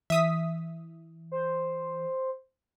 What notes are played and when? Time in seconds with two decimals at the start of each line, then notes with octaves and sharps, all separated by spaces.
0.10 E3 E5 D#6 B6
1.32 C5